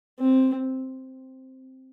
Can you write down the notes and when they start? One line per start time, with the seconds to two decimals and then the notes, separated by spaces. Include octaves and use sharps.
0.20 C4